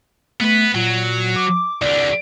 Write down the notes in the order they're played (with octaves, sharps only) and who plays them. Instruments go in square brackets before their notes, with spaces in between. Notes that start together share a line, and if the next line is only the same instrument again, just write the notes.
[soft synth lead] A3 [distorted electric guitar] B3 B4
[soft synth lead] A#2 [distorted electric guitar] F#3
[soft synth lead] D6
[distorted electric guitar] C2 D3 [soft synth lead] D5